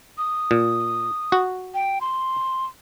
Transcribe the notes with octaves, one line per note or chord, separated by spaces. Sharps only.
D#6
A#2
F#4
G5
C6